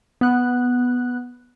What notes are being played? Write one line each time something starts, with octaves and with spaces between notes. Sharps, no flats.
B3 F#6